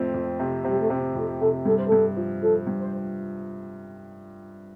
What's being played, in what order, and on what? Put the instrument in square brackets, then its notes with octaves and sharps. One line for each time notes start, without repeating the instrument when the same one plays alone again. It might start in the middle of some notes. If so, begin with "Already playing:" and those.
Already playing: [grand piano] F2 A3 C4
F2
C3
[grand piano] C3 [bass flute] G3
[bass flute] A3
[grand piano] C3 [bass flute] C4
[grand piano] F2 [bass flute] A3
[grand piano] C3 [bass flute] A4
[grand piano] G2 [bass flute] A4
[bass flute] C5
[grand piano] G2 [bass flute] A4
[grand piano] F3
[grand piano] F3 [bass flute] A4
[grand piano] G2
[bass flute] C5